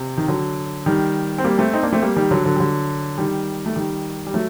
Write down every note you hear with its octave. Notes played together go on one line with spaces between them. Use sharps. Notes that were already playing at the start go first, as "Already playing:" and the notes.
Already playing: C3
D#3
D3 F#3
D#3 G3
C4
G3 A#3
A3 C4
C4 D#4
A#3 D4
A3 C4
G3 A#3
D#3 G3
D3 F#3
D3 F#3
G3
D3 F#3
D#3 G3
A3
D#3 G3
G3
F#3 A3